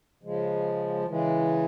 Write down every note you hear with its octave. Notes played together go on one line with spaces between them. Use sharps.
C#3 F3 G#3
C#3 E3 G#3